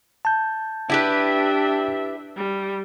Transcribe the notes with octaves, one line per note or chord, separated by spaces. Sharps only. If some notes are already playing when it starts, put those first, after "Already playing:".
A5 G6
D4 E4 G4 B4 E5
G3